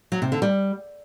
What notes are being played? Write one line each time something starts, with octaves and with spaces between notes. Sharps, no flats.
F#3
C3
D3
G3